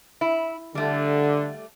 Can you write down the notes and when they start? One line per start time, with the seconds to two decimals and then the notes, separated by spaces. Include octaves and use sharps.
0.21 E4
0.75 D3 G3 A3